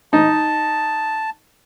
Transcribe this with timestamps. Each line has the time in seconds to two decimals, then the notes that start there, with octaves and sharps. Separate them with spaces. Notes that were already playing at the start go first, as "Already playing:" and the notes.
0.13 D#4 A5